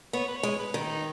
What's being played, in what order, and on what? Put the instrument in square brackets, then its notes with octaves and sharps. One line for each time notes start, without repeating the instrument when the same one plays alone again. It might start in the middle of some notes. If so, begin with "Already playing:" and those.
[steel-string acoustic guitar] B3 [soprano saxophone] C#5
[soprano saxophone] B4
C#5
[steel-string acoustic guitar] G#3
[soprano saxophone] B4
[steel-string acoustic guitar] D#3
[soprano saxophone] D#4